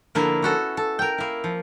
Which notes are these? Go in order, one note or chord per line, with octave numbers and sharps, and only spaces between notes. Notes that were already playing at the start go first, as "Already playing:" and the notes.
D3 F3 A#3 B3 E4 A#4
C#4 F#4 A4
A4
A#4 G5
A#3 E4
F3